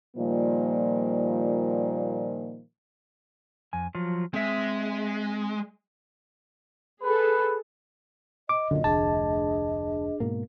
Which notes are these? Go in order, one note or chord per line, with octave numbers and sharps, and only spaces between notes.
A#2 D#3 F3 G3 A#3
F2 G#5
F3 F#3 F4
G#3 C4 G#4 E5
G#4 A4 B4
D#5 D6
F#2 A#2 D3
F1 D2 D4 G#4 A5
G#2 B2 A#3